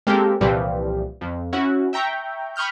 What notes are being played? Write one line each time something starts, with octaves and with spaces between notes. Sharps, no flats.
G#3 A#3 C4 G4 A4 A#4
C2 A#2 E3 F3 G3
F2
C#4 E4 F#4
E5 G5 A#5 C#6
B5 C#6 D#6 F6 G6